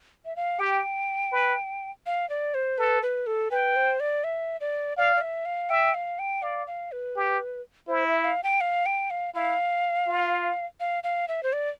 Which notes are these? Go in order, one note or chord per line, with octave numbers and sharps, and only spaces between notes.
E5
F5
G4 G5
B4
F5
D5
C5
A4 B4
B4
A4
B4 G5
C5
D5
E5
D5
D5 F5
D5
E5
F5
E5 G5
F5
G5
D5 F5
F5
B4
G4
E4 C5
E5
F5
G5
F5
G5
F5
E4 F5
F4
F5
F5
E5
C5
D5